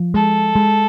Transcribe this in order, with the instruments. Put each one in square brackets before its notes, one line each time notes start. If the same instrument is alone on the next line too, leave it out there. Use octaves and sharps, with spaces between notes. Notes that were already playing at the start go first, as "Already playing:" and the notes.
Already playing: [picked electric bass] F3
[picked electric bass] G#3 [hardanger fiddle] A4
[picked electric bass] G#3